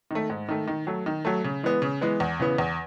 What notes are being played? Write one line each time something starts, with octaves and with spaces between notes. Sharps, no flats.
D#3 A3
G#2
D#3 A3
D#3
F#3 A3
D#3
F#3 A3
C#3
E3 G#3 B3
C#3
E3 G#3 B3
E2
C#3 E3 B3
E2